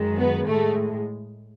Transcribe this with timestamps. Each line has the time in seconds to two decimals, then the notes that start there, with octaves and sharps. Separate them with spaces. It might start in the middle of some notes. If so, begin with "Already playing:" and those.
Already playing: F#2 D#3 G#3
0.18 B3
0.48 A2 G#3 A3